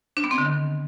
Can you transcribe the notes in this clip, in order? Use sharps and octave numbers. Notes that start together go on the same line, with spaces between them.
D4
B3
C4
D3
D#3